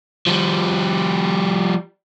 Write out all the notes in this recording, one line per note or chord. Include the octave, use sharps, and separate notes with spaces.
F3 G3